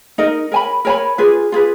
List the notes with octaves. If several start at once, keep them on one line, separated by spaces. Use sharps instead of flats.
D#4 A#4 D#5
A#4 C#5 G#5 B5
A#4 C#5 G#5 B5
F4 G#4 B4
F4 G#4 B4